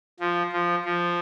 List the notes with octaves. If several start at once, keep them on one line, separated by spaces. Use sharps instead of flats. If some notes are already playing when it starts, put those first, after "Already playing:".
F3
F3
F3